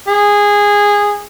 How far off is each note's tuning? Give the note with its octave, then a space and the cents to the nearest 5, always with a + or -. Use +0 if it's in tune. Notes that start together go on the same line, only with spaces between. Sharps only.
G#4 -15